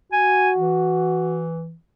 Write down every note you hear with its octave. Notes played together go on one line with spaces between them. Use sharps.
F#4 G#5
E3